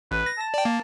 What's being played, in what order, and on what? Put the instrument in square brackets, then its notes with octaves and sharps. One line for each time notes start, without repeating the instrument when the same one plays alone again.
[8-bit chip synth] A1 [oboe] B4
[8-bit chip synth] A#6
[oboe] A5
[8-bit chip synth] D5 G5
A#3